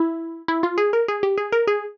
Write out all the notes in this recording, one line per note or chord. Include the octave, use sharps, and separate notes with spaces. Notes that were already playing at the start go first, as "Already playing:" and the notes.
Already playing: E4
E4
F4
G#4
A#4
G#4
G4
G#4
A#4
G#4